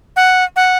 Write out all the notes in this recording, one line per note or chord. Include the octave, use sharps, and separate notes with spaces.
F#5
F#5